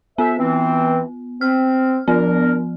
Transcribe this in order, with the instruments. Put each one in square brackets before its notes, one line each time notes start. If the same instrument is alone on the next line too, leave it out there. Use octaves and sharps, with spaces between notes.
[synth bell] B3 [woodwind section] A4 C5 E5
[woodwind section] E3 C4
[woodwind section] C4 [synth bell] F6
[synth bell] F3 B3 [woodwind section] D4 A#4